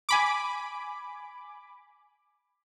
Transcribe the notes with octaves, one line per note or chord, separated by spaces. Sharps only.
G#5 B5 D6